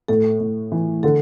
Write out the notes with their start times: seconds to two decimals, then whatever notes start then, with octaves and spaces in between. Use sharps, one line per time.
0.08 A2 A4
0.40 A2
0.72 E3
1.03 D3 A4